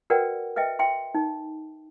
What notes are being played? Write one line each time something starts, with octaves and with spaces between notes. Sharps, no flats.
F#4 A#4 B4 D5 F#5 G5
B4 D#5 E5 G5
E5 G5 C6
D#4